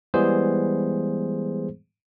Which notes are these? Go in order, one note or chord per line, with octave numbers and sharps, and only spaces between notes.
E3 G3 G#3 B3 G#4 C5